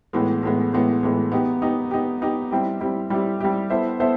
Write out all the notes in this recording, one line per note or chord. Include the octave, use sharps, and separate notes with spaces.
A2 E3 G#3 B3
A2 E3 G#3 B3
A2 E3 G#3 B3
A2 E3 G#3 B3
B3 D#4 G4
B3 D#4 G4
B3 D#4 G4
B3 D#4 G4
G3 C4 E4 G4
G3 C4 E4 G4
G3 C4 E4 G4
G3 C4 E4 G4
B3 E4 A4 C5 E5
B3 E4 A4 C5 E5